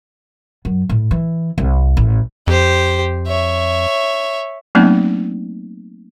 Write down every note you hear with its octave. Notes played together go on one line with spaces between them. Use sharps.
F#2
A2
E3
C2
A1
F2 G4 C5
C#5 E5
F#3 A3 A#3 C4 C#4 D#4